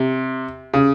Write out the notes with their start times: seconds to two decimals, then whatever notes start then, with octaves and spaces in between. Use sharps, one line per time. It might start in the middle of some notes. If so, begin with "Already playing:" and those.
Already playing: C3
0.74 C#3